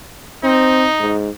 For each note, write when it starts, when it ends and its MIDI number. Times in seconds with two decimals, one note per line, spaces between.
0.43 0.87 60
0.43 1.15 63
1.00 1.29 44